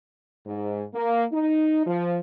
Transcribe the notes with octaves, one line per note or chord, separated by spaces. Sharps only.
G#2
A#3
D#4
F3